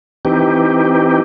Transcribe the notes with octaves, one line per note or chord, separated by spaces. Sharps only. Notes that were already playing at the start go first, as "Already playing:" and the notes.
E3 C4 D#4 G4